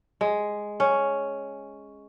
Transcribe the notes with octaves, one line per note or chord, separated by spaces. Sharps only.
G#3
C#4